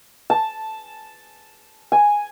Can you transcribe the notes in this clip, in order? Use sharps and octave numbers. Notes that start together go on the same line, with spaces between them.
A5
G#5